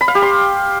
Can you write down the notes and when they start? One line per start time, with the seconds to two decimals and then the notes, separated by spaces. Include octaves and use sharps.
0.01 B5
0.08 F5
0.15 G4
0.22 C6